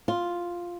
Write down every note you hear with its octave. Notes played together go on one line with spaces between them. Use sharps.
F4